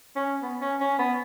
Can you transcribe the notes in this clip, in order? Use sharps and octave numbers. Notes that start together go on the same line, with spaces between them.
C#4
B3
C#4
C#4
B3